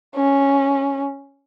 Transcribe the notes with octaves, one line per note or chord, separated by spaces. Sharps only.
C#4